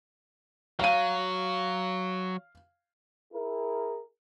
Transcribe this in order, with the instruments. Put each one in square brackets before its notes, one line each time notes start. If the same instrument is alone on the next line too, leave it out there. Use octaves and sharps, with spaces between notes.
[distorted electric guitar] F#3 [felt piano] F5 D#7
[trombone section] E4 G#4 A#4